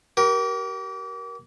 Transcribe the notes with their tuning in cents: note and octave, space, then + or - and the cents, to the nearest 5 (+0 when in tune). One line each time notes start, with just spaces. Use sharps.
G4 -35 A#4 +20